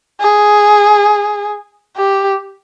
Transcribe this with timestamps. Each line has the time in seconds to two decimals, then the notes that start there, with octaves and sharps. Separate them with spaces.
0.20 G#4
1.97 G4